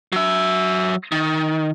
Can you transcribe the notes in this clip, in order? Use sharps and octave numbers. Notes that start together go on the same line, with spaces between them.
F#3 E5
D#3